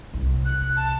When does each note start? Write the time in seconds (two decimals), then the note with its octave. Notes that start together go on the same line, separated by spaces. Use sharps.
0.14 C2
0.45 F#6
0.76 A5